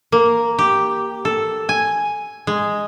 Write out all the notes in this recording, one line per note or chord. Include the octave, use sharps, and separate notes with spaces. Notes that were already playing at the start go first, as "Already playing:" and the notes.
A#3
G4
A4
G#5
G#3